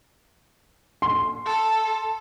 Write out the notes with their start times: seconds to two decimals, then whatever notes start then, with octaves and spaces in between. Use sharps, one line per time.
1.02 C6
1.45 A4